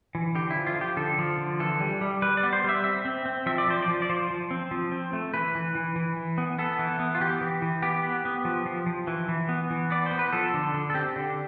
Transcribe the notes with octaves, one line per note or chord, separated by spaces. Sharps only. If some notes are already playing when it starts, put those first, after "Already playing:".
E3
D3 G4
E4
F3
F4
F3
G4
D3 A4
F3
D3
E3 A4
G3
G3
G3 B4
D5
B3
C5
G3 E5
C4 E5
C4
C4
F3 E5
D5
F3 C5
D5
F3
D5
F3 C5
F3
C4
F3
C4
A3
E3 B4
E3
E3
E3
E3
B3
B3 A4
E3
B3
F4
E3 G4
E3
E3
B3 G4
B3
B3
F3
F3
F3
E3
E3
B3
E3
B3 D5
B3 C5
B4
F3 A4
D3
D3
A4
C4 G4
D3